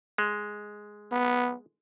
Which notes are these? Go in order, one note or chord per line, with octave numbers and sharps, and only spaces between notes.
G#3
B3